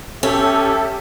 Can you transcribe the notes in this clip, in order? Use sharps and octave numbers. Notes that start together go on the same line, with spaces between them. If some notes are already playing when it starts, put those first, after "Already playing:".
C#4 G4 A4 E5